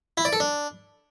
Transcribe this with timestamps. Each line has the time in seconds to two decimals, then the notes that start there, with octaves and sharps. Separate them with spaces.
0.17 E4
0.25 D5
0.33 A4
0.40 D4